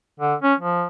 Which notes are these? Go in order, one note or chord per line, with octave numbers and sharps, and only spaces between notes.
D3
C#4
F3